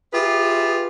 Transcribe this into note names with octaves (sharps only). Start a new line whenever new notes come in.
F4 G4 G#4 B4 E5